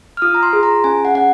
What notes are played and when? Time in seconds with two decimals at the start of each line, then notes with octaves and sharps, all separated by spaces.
0.17 F6
0.22 F4 D#6
0.35 A#5
0.43 C6
0.53 G#4
0.63 A#5
0.84 C#4 G#5
1.05 F#5
1.15 C#4 F#5